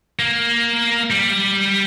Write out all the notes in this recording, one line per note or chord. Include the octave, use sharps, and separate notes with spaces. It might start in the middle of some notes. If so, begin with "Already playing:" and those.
A#3
G3